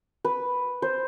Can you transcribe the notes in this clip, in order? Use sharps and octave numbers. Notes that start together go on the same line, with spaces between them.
B4
C5